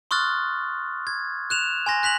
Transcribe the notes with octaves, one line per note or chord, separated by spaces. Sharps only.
C6 C#6 D#6 F6 F#6 A6
G#6
F#6 E7 F7
G#5 C6 A#6
F#6 B6 F7 F#7